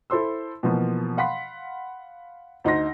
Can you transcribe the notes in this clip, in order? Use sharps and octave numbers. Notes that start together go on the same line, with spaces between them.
E4 A4 C5 C6 E6
B2 E3 F3 A#3
F5 F#5 B5 C6 B6
D2 D#4 C6 A#6